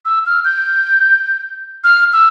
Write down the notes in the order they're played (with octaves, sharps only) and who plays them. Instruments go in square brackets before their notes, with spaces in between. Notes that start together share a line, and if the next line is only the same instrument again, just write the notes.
[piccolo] E6
F6
G6
F6
E6